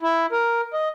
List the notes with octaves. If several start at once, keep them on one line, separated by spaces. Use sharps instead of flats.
E4
A#4
D#5